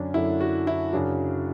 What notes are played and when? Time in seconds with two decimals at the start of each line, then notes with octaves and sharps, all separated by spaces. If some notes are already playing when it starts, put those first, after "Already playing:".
Already playing: F#2 D3 F#3 C#4 D4
0.14 F#2 D3 F#3 E4
0.41 F#4
0.67 E4
0.93 F#2 C#3 F#3 D4